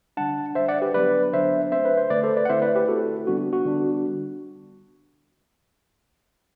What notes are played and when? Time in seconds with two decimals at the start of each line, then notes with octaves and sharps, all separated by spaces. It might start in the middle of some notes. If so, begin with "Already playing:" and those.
0.17 D3 G3 D4 F#5 A5
0.55 D3 G3 D4 C5 E5
0.68 D5 F#5
0.82 G4 B4
0.94 D3 F#3 B3 D4 B4 D5
1.33 D3 F#3 B3 D4 C5 E5
1.72 D3 A3 C4 C5 E5
1.85 B4
1.97 C5
2.10 D3 A3 C4 B4 D5
2.23 A4 C5
2.36 B4 D5
2.45 F#5
2.49 D3 A3 C4 E4 C5 E5
2.62 B4 D5
2.75 G4 B4
2.88 D3 A3 C4 E4 F#4 A4
3.27 D3 G3 B3 D4 F#4
3.53 F#4
3.65 D3 G3 B3 D4